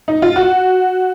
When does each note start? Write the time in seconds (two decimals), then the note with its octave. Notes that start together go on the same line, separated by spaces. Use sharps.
0.08 D#4
0.22 F4
0.36 F#4